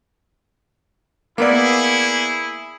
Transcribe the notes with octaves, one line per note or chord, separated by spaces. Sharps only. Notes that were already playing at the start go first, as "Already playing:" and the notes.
A#3 B3 E4 G#4 D5